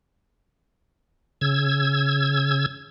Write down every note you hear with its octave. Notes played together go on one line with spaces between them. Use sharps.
C#3 E6 G#6